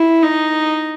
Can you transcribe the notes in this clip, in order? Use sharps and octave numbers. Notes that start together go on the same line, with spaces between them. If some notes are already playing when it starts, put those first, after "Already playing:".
Already playing: E4
D#4